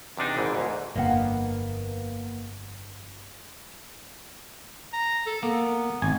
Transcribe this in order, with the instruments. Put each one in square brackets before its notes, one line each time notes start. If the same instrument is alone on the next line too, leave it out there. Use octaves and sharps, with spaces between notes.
[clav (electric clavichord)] E2 C3 D4 D#4
G#1 G#2 E3
D2 G#2
[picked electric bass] G1 F2 D3 [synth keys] A#3 B3 [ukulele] D#5 F5 F#5
[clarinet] A#5
A4
[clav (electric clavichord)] A#3 [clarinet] B3
[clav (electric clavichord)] G#1 G#5